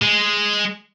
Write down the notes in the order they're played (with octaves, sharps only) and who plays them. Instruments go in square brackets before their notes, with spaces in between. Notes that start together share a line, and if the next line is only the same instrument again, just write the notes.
[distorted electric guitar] G#3